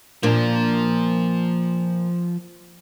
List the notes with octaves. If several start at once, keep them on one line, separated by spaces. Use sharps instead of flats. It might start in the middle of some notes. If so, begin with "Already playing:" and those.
A#2 F3 A#3 D4